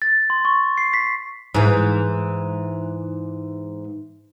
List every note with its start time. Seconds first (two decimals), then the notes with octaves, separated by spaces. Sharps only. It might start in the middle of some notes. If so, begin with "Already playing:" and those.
0.02 A6
0.30 C6
0.45 C#6
0.78 C7
0.94 B6
1.55 G#2 E3